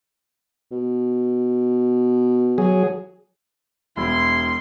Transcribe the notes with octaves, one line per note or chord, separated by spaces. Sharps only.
B2
F#3 G#4
E1 E4 C6